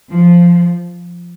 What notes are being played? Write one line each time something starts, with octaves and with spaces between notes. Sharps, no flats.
F3